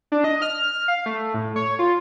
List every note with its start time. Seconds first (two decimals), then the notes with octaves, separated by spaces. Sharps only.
0.12 D4
0.24 D#5
0.42 F6
0.88 F5
1.06 A3
1.34 A2
1.56 C#5
1.79 F4